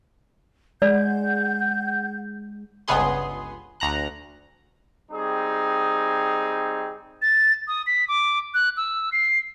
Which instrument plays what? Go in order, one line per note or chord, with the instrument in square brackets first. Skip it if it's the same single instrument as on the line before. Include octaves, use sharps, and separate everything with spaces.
[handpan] G#3 [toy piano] D5 [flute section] F#5 G6
[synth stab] G1 C#2 B3 G#4 C6
D2 A#5 F#6
[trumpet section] G3 C4 D#4 G#4
[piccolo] A6
D#6
B6
D6
F#6
E6
C7